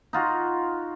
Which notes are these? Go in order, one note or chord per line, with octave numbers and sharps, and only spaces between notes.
D#4 F4 F#4